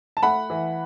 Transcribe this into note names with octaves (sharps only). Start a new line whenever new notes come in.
A5
A3 F#5 B5
E3